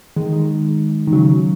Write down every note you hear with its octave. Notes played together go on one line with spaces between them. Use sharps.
D#3 G#3
D#3 G#3
D#3
C#3 F#3